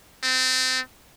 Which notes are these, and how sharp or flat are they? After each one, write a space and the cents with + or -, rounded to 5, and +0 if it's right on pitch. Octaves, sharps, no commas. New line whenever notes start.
C4 -25